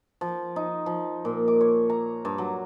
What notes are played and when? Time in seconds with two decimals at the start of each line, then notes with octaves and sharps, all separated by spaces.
0.21 F3
0.56 D#4
0.86 F3
1.25 A#2
1.48 D6
1.61 C#5
1.90 A#5
2.25 G2
2.38 F#3